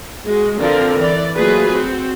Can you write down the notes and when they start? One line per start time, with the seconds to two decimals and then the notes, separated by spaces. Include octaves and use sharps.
0.25 G#3 F#4
0.59 D3 F3 C4 A#4 D5
0.99 E3 D5
1.35 F#3 A3 A#3 F4 G#4 B4
1.72 C4 F#4